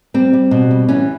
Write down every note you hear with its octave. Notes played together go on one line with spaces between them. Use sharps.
G3 C4
G3
B2
G3
E3 C#4